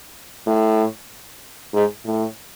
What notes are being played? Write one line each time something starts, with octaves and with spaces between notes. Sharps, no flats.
A2
G#2
A2